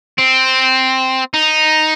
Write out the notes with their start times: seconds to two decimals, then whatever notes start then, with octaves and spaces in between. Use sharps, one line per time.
0.18 C4
1.34 D#4